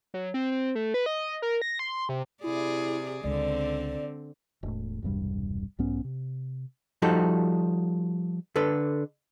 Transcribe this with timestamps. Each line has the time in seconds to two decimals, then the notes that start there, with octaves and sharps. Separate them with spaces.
0.14 F#3
0.34 C4
0.51 C4
0.75 A3
0.94 B4
1.06 D#5
1.42 A#4
1.62 A#6
1.79 C6
2.09 C3
2.44 C3 E4 G#4 D5
3.24 C#2 D3 C4 D5
4.63 E1 A2
5.03 E1 C2 G2 G3
5.79 B1 G#2 B3 C#4
6.04 C3
7.02 F3 G3 D#4 F#4 A4
8.56 D3 A4 B4